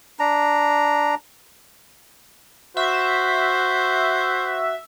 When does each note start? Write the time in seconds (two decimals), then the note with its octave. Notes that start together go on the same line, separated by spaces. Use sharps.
0.19 D4 A#5
2.77 F#4 C5 E5